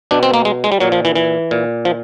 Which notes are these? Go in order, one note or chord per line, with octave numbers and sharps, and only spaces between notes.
B2 D4
C4
A#3
G#3
G#3
G3
A#2 F#3
F3
E3
E3
A#2
F3